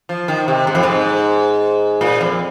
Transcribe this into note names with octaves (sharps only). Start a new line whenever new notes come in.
F3
D#3
C3
G#2
F2
G#2
A#2
F2